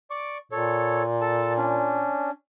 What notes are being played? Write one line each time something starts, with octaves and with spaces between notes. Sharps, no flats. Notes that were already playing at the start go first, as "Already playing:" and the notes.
D5 C#6 D6
A#2 A4 C#5
A4 A5
C#4 D4